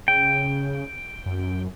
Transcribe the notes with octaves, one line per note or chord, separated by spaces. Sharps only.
C#3 G5
F#2